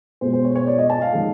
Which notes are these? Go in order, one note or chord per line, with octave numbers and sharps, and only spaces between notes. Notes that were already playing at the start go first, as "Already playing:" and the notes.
B2 G#3 B3 C5
C5
C#5
C#5
D5
D#5
A5
F5
D#3 G#3